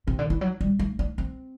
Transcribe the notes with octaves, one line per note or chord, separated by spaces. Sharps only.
C3
D3
E3
F#3
G3
A3
D4
C4